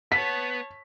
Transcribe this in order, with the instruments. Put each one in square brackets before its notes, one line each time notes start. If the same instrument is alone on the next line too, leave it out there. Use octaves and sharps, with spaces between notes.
[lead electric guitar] B3 [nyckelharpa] C#5 A5 [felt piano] B6